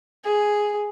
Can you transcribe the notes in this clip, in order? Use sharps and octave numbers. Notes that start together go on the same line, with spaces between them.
G#4